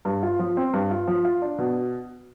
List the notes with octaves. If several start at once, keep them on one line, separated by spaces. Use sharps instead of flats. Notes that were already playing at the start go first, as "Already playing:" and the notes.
G2
F4
F3
C4
G2
F4
F3
F4
D4
B2